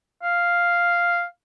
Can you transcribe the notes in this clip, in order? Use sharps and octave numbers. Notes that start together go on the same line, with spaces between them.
F5